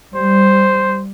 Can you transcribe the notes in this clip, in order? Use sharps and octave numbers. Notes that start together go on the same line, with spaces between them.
G3 C5